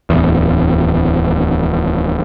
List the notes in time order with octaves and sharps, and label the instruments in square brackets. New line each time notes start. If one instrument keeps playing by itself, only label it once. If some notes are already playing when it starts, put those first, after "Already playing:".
[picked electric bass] D1 E2